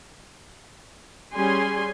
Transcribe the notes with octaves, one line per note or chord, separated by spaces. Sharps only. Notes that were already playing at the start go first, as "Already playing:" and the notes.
G3 C#4 G#4 G#5 C6